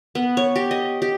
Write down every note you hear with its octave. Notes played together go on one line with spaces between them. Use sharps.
B3
C#5
G4
D#5
G4